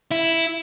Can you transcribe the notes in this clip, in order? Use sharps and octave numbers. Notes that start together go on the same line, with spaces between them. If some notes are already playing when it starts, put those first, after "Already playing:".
E4